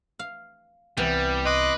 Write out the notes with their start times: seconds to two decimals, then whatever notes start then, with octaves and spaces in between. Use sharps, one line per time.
0.19 F5
0.97 C2 C3 E3 G3 B3
1.46 B4 D#5 C6 D6